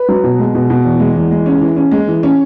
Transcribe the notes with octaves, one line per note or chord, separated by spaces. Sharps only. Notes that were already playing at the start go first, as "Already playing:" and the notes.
Already playing: B4
F#3
B2
G#3
B2
B2
E2
G#3
E2
G#3
C#4
E3
C#4
G#3
E3
C#4